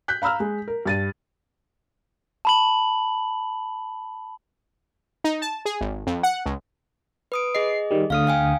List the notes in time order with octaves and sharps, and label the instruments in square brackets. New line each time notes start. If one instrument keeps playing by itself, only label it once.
[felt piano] F#6 G6 B6
F5 A#5 B5 E6 F6
G#3
A#4
G2 A6 D#7
[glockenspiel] A5 B5 F#7
[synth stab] D#4
A5
G#4
G#1
F2
F#5
C#2
[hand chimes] B4 D#6 D7
[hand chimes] G#4 D#5 [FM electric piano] C7
[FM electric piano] D#3 G3
[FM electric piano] D2 D3 D#6 [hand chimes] F5 F6
[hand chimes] F5 G5 G#5